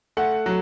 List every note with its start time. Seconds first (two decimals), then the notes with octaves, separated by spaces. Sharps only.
0.17 A3 F#5
0.46 F#3